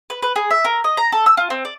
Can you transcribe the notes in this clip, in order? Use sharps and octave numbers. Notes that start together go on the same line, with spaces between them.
B4
B4
G#4
E5
A#4
D#5
A#5
A4
E6
F4
C4
D5